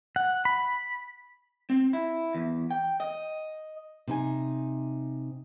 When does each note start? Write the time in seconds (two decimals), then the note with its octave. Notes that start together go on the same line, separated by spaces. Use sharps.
0.16 F#5
0.45 B5
1.70 C4
1.93 E4
2.35 E2
2.71 G5
3.00 D#5
4.07 C3 D#4 G#5